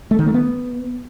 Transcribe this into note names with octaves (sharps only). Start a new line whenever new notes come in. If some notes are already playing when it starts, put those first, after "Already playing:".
A3
D#3
A3
B3